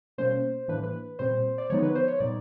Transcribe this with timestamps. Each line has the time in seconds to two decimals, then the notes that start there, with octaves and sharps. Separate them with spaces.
0.18 B2 G3 A#3 C#4 C5
0.68 A2 E3 G3 A#3 D4 B4
0.83 B4
1.19 A#2 G3 C4 C5
1.58 D5
1.70 D3 F3 G#3 B3 D#4 C#5
1.83 B4
1.95 C5
2.08 C#5
2.20 A#2 G3 B3 D#4 D5